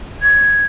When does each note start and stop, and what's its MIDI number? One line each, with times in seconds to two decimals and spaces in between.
0.22 0.66 92